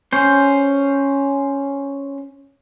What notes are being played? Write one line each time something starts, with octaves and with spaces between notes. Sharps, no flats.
C#4 C5